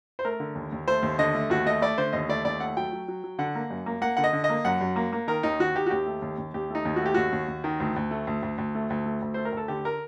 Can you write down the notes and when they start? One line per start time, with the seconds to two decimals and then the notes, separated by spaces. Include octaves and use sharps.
0.19 C5
0.25 A3 A#4
0.40 D3
0.55 D#2
0.72 D#2
0.88 A3 C5
1.02 D#2
1.19 D3 D#5
1.34 A3
1.50 D#2 F#4
1.66 A3 D#5
1.82 A3 D5
1.98 D3 C5
2.13 D#2 D#5
2.29 A3 D5
2.45 D#2 D5
2.60 A3 F#5
2.77 F#3 G5
2.93 F#3
3.08 F#3
3.24 F#3
3.39 D3 F#5
3.55 A#3
3.70 F#2
3.86 A#3
4.02 A#3 F#5
4.17 D3 F#5
4.24 D#5
4.33 D3
4.44 D#5
4.50 A#3
4.65 F#2 F#5
4.81 F#2
4.96 A#3
5.12 A#3
5.27 D#3 A#4
5.43 D#2 D#4
5.60 D#3 F#4
5.75 D#3 G4
5.86 F#4
5.91 D#2 G4
6.06 A3
6.22 D#2
6.38 D#2
6.54 D#2 G4
6.70 A3 D#4
6.85 D#2
6.96 F#4
7.01 A3 G4
7.14 D#2 F#4
7.32 D#2
7.48 D#2
7.64 D#3
7.80 D2
7.96 D2
8.11 A3
8.27 D2
8.43 D2
8.58 D2
8.75 A3
8.90 D2
9.06 A3
9.22 D2
9.34 A3 C5
9.45 A#4
9.52 D2 A4
9.68 D3 G4
9.85 A#4